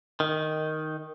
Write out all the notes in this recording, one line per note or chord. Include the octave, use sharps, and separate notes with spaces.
D#3